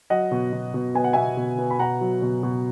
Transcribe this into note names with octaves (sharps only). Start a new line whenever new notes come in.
F#3 D#5 F#5
B2
B2
B2
B3 G#5
F#5
B2 E5 G#5
B2
B3
B5
B2 F#5 A#5
F#3
B2
B2